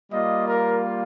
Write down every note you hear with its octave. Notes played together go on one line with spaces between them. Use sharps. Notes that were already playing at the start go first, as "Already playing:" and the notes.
G3 A#3 F4 D#5
A#4